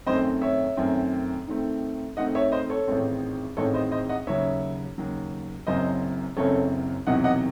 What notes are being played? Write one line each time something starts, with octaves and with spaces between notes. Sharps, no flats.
F#2 D#3 A3 C4 C5 D#5
C#5 E5
F#2 D#3 A3 C4
G#2 D#3 A3 C4
G#2 D#3 A3 C4 D#5 F#5
C#5 E5
C5 D#5
A4 C#5
A1 G#2 D#3 G#3 C4
A1 G#2 D#3 G#3 C4 A4 C#5
C5 D#5
C5 D#5
D#5 F#5
D#2 C#3 F#3 C#5 E5
D#2 C#3 F#3
F#1 F#2 C#3 F#3 C4 C5 D#5
F#1 F#2 C#3 F#3 C4 A4 C#5
E1 E2 C3 D#3 F#3 D#5 F#5
D#5 F#5